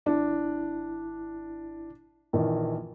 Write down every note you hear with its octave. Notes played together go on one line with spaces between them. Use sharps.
G#1 D4 E4
A#1 D#3 E3